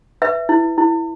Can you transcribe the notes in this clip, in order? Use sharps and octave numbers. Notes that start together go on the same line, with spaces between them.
B4 E5
E4
E4